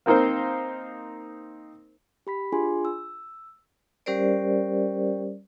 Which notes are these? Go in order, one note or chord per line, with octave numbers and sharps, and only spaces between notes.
A#3 C4 D#4 A#4 C5
G4 B5 B6
D4 F4 G#4 G#5 C6
E6
G3 C#4 G4 A#4 C5 D5